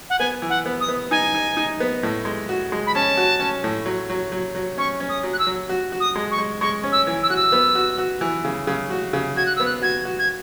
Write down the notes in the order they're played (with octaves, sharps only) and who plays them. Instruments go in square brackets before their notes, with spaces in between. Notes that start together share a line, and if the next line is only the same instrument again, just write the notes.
[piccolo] F#5
[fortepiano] B3 [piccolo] G#5
[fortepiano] E3
[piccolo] F#5
[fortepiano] B3
[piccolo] D#6
[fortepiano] B3
[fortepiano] D#4 [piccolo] G#5
[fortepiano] D#4
D#4
B3
A2
G#3
F#4
G#3
[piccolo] B5
[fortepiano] C#4 [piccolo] A5
[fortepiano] F#4
C#4
A2
F#3
F#3
F#3
F#3
[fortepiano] C#4 [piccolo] C#6
[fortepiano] C#4
[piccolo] D#6
[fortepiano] F#3
[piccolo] F#6
E6
[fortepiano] F#3
F#4
F#4
[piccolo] D#6
[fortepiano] G#3
[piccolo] C#6
[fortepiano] G#3
[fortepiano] G#3 [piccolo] C#6
[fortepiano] C#4
[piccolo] E6
[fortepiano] E3
[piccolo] E6
[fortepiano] F#4 [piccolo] F#6
[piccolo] E6
[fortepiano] B3
F#4
F#4
E3
C#3
C#3
F#4
C#3
[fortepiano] F#4 [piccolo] G#6
[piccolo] F#6
[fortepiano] B3 [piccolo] E6
[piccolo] F#6
[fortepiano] F#4 [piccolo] G#6
[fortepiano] F#4
[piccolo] G#6